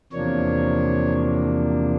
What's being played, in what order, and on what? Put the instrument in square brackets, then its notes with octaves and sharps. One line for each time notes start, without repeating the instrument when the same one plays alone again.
[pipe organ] E2 C3 F3 A#3 D4 C#5